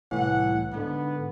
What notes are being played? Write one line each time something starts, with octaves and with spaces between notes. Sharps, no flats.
C2 A2 E3 F#5
G#2 D3 B3